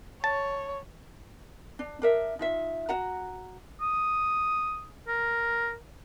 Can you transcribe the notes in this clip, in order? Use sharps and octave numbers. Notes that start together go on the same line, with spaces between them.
C#5 A5
D4
D4 A#4 E5
D#4 F4 E5
F#4 F#5 A#5
D#6
A#4